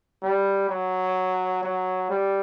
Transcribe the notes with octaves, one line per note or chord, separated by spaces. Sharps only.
G3
F#3
F#3
G3